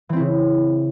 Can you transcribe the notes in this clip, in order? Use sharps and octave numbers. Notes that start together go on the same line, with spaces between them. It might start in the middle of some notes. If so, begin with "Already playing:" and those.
C#3 E3 C4 E4